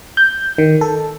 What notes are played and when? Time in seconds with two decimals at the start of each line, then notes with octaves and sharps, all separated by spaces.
0.17 G6
0.58 D#3
0.81 A4